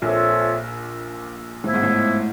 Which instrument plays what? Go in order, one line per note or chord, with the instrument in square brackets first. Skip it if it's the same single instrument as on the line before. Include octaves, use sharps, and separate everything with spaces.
[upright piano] A#1 A#2 [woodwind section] C4 F4 A4 C#5 E5
[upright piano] A2 [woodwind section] F3 G#3 B3 E4
[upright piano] G#2
A2